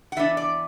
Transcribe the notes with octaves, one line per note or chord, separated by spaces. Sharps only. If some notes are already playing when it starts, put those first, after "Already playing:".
F#5
E3 B3 D4 E5
D5